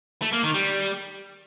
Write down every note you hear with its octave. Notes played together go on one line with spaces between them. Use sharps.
A3
A#3
D#3
G3